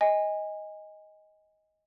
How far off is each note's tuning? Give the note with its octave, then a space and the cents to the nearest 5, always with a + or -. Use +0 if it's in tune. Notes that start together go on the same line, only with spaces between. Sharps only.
D#5 +10 G#5 -20